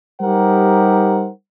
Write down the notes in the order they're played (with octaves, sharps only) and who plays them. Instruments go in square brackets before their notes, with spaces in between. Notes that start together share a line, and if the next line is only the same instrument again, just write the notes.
[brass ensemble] G3 D#4 G4 A#4 C5 F#5